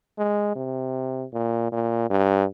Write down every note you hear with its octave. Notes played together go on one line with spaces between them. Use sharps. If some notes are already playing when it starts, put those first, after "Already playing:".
G#3
C3
A#2
A#2
G2